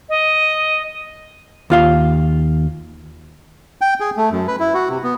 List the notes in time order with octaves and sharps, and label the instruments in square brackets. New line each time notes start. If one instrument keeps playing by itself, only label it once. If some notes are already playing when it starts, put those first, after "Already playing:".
[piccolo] D#5
[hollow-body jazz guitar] D#2 F4 F5
[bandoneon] G5
G#4
A3
F#2
B4
E4
F#4
C3
B3